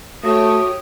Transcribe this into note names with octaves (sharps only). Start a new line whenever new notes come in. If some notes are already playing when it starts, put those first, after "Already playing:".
A3 F#4 G4 C#5 D#6